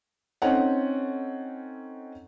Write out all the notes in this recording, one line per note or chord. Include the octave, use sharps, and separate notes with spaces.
C4 C#4 D#4 A4 C#5 F#5